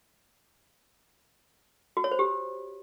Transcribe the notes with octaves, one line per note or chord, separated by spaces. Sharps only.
F#4
C#5
C5
G4